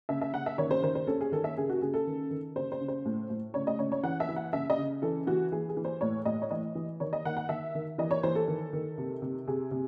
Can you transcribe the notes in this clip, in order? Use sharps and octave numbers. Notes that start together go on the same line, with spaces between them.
C#3 E5
E5
C#3 F#5
E5
D#3 C#5
C5
D#3 C5
C5
C#4 A4
G#4
D#3 A4
E5
C#3 G#4
F#4
C#3 G#4
A4
D#3
D#3
C#3 C5
C5
C#3
C5
A2
A2
C#3 C#5
D#5
C#3 C#5
C#5
E3 F#5
E5
E3
F#5
C#3 E5
D#5
C#3
E3 A4
E3 F#4
E3 G#4
G#4
E3
C5
A2 C#5
A2 D#5
C#5
E3 D#5
E3
D#3 C#5
D#5
D#3 F#5
F#5
D#3 E5
D#3
E3 D#5
C#5
E3 C5
A4
D#3
D#3
C3
C3
C3 G#4
C3